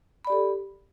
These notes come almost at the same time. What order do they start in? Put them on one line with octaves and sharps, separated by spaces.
B5 D5 G4 A4